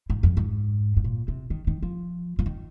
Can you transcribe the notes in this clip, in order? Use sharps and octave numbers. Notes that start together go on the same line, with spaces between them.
G#2
F2
G#2
G#2
A#2
C3
D#3
D#3
F3
F3
D#3